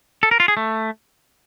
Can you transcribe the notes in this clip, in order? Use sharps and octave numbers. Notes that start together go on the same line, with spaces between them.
A4
A#4
F4
G#4
A3